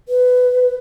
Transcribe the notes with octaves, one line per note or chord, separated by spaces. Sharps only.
B4